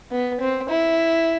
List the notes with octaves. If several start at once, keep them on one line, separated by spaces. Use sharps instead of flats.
B3
C4
E4